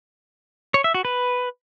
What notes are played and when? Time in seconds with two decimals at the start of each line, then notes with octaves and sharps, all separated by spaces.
0.74 C#5
0.84 E5
0.94 F#4
1.05 B4